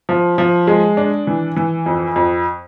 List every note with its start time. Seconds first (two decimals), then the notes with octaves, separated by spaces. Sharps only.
0.09 F3
0.38 F3
0.67 G#3
0.97 D4
1.27 E3
1.56 E3
1.86 F2
2.16 F2